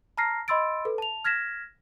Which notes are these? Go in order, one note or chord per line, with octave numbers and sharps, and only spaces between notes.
A5 A#5 F6 A#6 C7
D#5 B5 C6 E6 A6 D7
A4 B4
A5 F7
F6 G#6 A#6 B6 E7